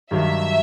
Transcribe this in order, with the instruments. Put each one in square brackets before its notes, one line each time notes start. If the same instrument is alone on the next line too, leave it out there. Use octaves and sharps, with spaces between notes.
[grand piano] G2 D#3 F#3 [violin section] E5